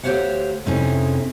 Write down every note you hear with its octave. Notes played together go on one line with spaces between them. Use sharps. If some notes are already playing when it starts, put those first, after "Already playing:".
D2 G4 C5 C#5 F5 F#5
F2 C3 C#4 D#4 E4 G#4